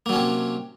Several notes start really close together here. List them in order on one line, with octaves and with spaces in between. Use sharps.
A#3 F#3 C#4 C3